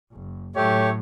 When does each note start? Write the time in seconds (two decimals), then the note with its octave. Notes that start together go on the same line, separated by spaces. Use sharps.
0.12 F#1
0.56 A2 F#3 A3 G4 C#5